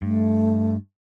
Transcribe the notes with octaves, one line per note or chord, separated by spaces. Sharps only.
G2 A3